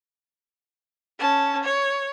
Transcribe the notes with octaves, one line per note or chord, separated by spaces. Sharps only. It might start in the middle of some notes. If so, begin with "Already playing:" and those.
C#4 A5
C#5